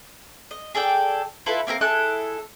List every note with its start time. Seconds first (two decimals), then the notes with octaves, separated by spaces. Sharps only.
0.51 D#5
0.75 G#4 A4 D5 G5
1.46 E4 F4 A4 B4
1.67 A#3 C4 G4 A#4
1.81 E4 G#4 A4 F#6